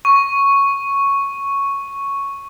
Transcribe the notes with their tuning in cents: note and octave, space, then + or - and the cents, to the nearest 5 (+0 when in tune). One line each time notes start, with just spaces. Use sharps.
C#6 +0